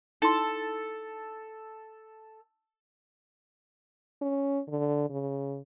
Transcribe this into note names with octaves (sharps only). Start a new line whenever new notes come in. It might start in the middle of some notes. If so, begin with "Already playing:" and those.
D#4 E4 A4 A5 C6
C#4
D3
C#3